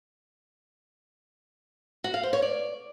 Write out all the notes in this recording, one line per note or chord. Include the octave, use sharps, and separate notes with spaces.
F#4
F5
C5
C#5
D5